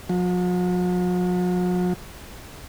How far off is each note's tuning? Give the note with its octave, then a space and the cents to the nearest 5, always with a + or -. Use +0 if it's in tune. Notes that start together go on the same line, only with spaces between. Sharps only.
F#3 -45